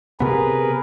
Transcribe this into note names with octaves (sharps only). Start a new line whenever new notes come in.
C3 B3 G#4 A#4 B4